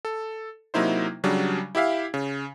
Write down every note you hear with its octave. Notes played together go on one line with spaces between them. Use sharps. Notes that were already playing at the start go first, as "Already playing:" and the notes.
A4
C3 F#3 A#3 D#4 E4 C5
C#3 F#3 G3 D4
E4 G4 E5 F5
C#3